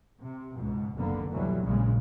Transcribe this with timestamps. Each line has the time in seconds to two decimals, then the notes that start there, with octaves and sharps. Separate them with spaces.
0.22 C3
0.57 C#2 G#2 B2
0.95 F#1 C2 D3 A#3 B3
1.31 D2 B2 E3 F#3 G3
1.62 A#1 A#2 C#3 G#3